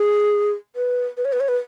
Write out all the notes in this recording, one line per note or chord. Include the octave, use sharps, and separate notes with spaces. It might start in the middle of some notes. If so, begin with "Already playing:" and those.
Already playing: G#4
B4
B4
C#5
B4
C#5
B4